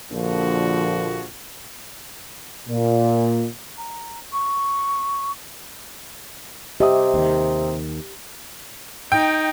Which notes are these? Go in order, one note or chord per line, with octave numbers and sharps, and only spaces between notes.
A#1 A#2 D3 F3 F#4
A#2
A#5
C#6
C3 G4 D#5 E5 D#6
D#2 D#3
D#4 G5